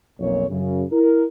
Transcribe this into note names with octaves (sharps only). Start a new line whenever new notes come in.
B1 F2 A#2 C#5
F#2 C#3
E4 A#4